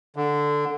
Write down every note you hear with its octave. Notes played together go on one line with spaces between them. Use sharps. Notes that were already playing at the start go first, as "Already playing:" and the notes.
D3